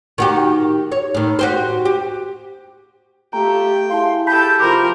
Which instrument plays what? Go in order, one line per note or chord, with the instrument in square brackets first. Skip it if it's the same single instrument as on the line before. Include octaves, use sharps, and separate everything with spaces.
[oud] D#3 F#4 G4
C#5
A2 D#3
F#4 G4 C5
G4
[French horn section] A3 F4 G4 [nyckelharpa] G5 [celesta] A#5
[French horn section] E4 G#4 [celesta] F5 A5 [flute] C6
[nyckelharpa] G4 A4 [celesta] A5 B5 B6 [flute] G6
[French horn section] F2 C3 F3 [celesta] F4 B5 D6 [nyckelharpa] A#4 [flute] C6